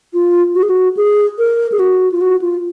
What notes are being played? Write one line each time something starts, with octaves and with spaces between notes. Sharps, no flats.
F4
F#4
G#4
F#4
G#4
A#4
G#4
F#4
F4
F#4
F4